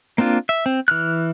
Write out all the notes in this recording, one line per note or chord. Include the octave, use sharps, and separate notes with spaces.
A#3 C4 D4 F4
E5
C4
E3 F6 F#6